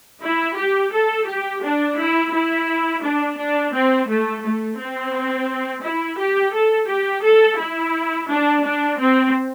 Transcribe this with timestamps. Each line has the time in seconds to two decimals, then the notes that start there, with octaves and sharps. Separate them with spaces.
0.22 E4
0.57 G4
0.92 A4
1.27 G4
1.63 D4
1.98 E4
2.33 E4
3.03 D4
3.38 D4
3.73 C4
4.08 A3
4.43 A3
4.78 C4
5.83 E4
6.19 G4
6.53 A4
6.89 G4
7.23 A4
7.58 E4
8.30 D4
8.64 D4
8.99 C4